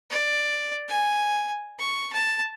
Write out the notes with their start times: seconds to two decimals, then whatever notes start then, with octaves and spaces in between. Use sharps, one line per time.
0.10 D5
0.89 G#5
1.79 C#6
2.13 A5